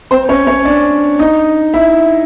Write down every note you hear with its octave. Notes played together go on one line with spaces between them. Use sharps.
C4 C5
C#4 C#5
C#4 C#5
D4 D5
D#4 D#5
E4 E5